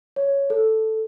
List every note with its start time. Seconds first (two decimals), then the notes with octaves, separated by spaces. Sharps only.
0.16 C#5
0.50 A4